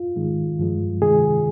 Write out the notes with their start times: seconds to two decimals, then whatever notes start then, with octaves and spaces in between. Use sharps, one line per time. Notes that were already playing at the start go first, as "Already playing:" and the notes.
Already playing: F4
0.16 G#2 D#3 G#3
0.59 G2 F3 G#3
1.02 C3 D#3 G#3 G#4